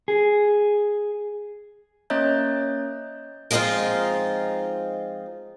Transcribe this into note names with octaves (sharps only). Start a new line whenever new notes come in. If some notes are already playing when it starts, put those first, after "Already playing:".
G#4
A#3 C#4 C#5 D#5 A#5 G6
F3 G#3 B3 C4 D#4 F4